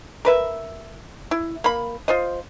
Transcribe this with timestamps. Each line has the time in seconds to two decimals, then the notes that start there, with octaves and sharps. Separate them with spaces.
0.25 A#4 B4 E5
1.31 E4
1.64 A#3 B5
2.08 F4 C5 D#5